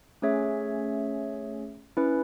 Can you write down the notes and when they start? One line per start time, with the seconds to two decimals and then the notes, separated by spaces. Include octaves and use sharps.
0.22 A3 C#4 G#4 C#5 E5
1.97 C#4 E4 B4